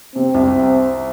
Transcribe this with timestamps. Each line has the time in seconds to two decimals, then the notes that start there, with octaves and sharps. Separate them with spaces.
0.16 C3 C4
0.34 C2